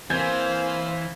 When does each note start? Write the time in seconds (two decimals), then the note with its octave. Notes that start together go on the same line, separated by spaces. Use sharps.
0.10 E3 A#3 C4 C5 F5 G#5 G6 G#6